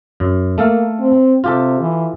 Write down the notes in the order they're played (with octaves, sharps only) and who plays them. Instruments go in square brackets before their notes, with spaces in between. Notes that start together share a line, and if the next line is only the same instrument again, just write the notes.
[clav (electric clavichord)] F#2
[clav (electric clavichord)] A3 A4 F5 [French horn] A#3
[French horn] C4
[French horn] C3 [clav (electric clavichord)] F4 G4 A4
[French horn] E3